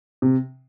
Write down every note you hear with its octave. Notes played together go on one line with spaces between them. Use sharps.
C3